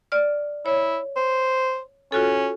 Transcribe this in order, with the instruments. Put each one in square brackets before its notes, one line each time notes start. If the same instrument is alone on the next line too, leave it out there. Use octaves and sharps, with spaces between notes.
[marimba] D5 F6
[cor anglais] E4 [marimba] C#5
[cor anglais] C5
[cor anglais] C#4 [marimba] F4 F#4 A4